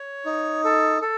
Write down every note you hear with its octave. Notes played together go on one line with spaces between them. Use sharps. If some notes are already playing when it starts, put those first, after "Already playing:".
Already playing: C#5
D#4
A4
A4